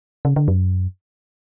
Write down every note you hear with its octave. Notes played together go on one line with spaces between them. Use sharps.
C#3
D3
F#2